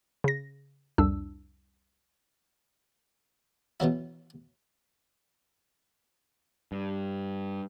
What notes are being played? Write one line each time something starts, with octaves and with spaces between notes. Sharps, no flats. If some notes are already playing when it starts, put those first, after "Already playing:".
C#3 A#6
C2 F2 D4 E6
B2 E3 F#3 E4
G2